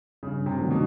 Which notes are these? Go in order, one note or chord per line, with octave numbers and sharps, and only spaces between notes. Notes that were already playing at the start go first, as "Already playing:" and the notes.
G2 C#3
C3
D#3 F#3 A3 D4
B2